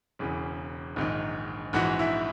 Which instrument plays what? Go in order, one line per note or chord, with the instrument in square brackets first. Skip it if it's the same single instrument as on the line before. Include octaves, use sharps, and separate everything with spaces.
[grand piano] E1 E2 C#3 E3
A#1 G#2 D#3
A#1 G#2 E3 F#4 F#5
E4 E5